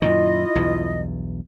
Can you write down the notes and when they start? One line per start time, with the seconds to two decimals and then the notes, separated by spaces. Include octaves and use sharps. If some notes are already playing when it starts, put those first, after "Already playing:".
0.02 F#2 A#2 D#3 E4 F4 D#5
0.55 B1 E2 G2